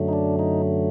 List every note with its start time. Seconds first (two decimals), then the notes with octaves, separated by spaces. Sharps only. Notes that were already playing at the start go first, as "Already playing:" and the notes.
Already playing: F#2 D3 F#3 A3
0.08 D#4
0.13 D4
0.39 D#4